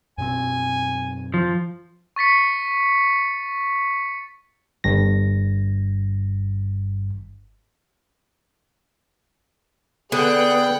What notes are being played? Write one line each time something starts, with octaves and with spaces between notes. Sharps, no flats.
F#2 B2 C4 G#5
F3
C#6 A6 B6 C#7
G1 G2 A#6
D3 B3 G#4 F#5 G5 F#6